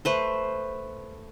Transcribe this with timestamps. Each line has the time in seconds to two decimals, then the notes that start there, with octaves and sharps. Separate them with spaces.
0.05 A3 B4 C5